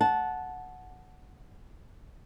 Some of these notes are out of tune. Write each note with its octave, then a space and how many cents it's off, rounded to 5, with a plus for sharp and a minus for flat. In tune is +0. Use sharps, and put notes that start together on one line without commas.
F#5 -5 A5 -15